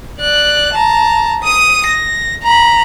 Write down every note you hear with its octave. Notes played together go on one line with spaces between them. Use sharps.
D5 F#6
A5 A#5
D#6 D#7
A#6
A#5 B5